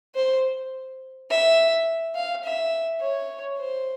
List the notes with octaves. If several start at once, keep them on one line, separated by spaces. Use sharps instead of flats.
C5
E5
F5
E5
C#5
C5